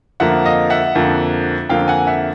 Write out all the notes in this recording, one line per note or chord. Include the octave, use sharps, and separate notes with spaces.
F2 D3 F3 A#3 E5 F#5
D#5 F5
E5 F#5
F2 D3 F3 A#3
F2 D3 F3 A#3 F5 G5
F#5 G#5
E5 F#5